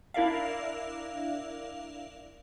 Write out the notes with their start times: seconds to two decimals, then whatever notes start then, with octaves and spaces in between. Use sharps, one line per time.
0.14 D4 E4 A#4 D5 E5 F5